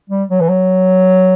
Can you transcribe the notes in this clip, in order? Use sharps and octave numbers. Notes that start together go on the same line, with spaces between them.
G3
F#3
E3
F#3